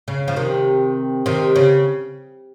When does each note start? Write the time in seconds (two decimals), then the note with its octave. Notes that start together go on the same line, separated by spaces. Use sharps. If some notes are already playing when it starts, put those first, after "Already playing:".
0.08 C#3
0.28 F3
0.36 C3 D#3
1.26 C3 D#3
1.56 C#3